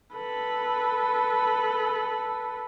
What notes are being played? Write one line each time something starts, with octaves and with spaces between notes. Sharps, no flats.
A4 B4